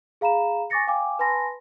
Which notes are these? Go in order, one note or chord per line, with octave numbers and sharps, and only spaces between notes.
G#4 F5 A#5 B5 E7
G#5 C#6 D6 A6 A#6 C#7
F5 G5 G#5 D6
B4 G#5 A5 B5 C6 A#6